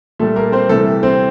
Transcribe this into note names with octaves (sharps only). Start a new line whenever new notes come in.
A#2 G3 A3 A4
A#3 A#4
C4 C5
C3 E3 G3 A3 A4
C4 C5